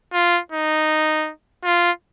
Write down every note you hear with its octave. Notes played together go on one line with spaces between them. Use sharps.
F4
D#4
F4